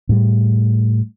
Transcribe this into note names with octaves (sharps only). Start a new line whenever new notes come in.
A2 G3